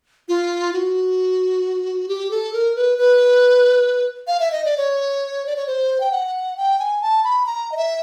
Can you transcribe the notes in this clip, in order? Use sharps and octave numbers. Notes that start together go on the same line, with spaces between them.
F4
F#4
G4
A4
A#4
B4
B4
F5
E5
D#5
D5
C#5
D5
C#5
C5
G5
F#5
G5
G#5
A5
B5
A#5
D#5
E5